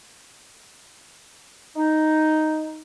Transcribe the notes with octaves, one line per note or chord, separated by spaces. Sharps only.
D#4